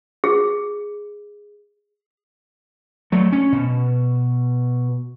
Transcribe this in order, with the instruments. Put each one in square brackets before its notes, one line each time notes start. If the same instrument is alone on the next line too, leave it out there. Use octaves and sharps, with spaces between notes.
[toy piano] G#4
[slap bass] F#3 A3
C#4
B2